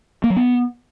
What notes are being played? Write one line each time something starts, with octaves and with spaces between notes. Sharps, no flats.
A#3
F#3
B3